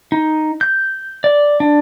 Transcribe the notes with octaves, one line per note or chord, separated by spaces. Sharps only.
D#4
G6
D5
D4